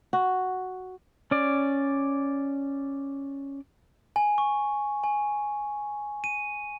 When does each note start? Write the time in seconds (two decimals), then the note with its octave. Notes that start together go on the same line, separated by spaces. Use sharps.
0.13 F#4
1.31 C#4 D5
4.16 G#5
4.38 C#6
5.04 G#5
6.24 D#7